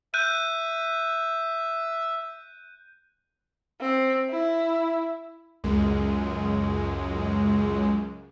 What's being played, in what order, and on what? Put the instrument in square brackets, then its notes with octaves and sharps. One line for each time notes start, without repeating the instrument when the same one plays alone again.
[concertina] E5 [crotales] F#6 G6 D#7
[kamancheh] C4
E4
[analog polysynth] C#2 F#2 G#3